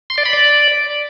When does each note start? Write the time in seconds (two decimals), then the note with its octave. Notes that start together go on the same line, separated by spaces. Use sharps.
0.10 C6
0.18 D5
0.25 B5
0.33 D5